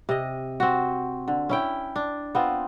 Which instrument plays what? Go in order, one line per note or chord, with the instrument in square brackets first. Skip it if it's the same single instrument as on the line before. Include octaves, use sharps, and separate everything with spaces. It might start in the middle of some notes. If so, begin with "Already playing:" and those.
[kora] C3 D#5
C4 F#4
D3
C#4 E4 G5
D4
B3 C4 F4